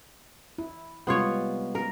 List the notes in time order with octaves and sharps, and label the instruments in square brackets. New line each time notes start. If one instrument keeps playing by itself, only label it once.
[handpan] E4
[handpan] C3 G3 G#3 [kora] B3 F4 C#5
[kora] A#4